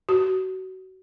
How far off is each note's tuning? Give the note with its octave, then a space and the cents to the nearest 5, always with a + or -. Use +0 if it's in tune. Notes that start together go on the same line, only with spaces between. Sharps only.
F#4 +25